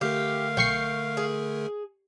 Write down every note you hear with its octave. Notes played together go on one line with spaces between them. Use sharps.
D3 A3 G4 A#4 F5
B1 G5 C#6 C7
G#4